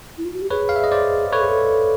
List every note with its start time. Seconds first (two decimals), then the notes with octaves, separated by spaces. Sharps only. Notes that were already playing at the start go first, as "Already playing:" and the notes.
0.18 E4
0.25 F4
0.34 F#4
0.42 G4
0.50 G#4 B4 C#5
0.69 F5
0.76 E5
0.84 D#5
0.91 C5 D5
1.32 A4 B4 C#5
1.41 G#4
1.48 A4